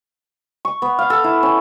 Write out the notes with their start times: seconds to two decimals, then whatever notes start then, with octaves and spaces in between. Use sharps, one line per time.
0.65 C#6
0.82 B3
0.99 F5
1.10 A4
1.24 E4
1.43 C#4